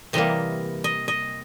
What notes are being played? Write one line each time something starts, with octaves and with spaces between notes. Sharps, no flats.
C3 E3 G3 A#3 D#5
D#5
D#5